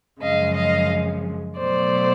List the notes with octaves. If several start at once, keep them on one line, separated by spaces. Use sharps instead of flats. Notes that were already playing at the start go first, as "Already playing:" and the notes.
F#2 C#3 F3 G#3 D#5 F5
D#5 F5
B2 F#3 A3 C5 D5